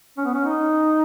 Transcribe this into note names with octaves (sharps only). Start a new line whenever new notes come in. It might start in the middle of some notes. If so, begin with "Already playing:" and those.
C#4
B3
C#4
D#4